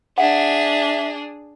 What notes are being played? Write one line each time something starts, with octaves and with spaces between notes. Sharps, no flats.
D4 G#4 E5 F#5